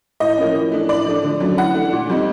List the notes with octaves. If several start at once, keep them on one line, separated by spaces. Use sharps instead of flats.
A2 D#5
F3 A#3 C#4
E3
A3 D4
A2 D5
F3 A3 D4
D3
F#3 A3 C#4
E3 F#5
A3 D4
A#2
G3 C4 D#4